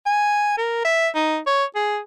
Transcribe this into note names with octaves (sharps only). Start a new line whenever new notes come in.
G#5
A#4
E5
D#4
C#5
G#4